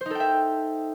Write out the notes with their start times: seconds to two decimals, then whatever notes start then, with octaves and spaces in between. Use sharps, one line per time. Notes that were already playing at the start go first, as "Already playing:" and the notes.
0.01 C5
0.06 D#4
0.10 A4
0.15 G5
0.20 E5